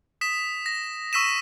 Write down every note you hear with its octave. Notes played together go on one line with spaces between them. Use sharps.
D#6 B6 E7
A#6
C#6 E6 B6 D#7 E7